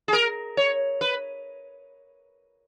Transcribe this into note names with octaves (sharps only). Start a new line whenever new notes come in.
G#4
A#4
C#5
B4